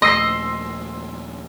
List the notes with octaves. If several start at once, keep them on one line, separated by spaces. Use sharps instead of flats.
A#1 D#2 A3 D#5 C6 E6 C7